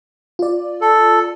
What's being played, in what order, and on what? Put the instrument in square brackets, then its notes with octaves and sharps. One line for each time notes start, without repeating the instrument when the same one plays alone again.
[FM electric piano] F4 D5
[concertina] A4